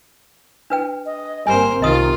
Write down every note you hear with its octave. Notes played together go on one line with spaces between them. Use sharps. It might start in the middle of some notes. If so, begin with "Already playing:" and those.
D4 B4 G5
D#5
G1 G3 A#3 C4 A#4 C5 G#5
C2 C3 D#3 F4 D#5 D#6